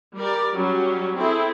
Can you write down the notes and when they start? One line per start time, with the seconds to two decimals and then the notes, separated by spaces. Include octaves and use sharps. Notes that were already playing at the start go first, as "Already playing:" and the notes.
0.17 G3 G4 A#4 D5
0.54 F#3 G3 C#4
1.18 C4 E4 G#4 A4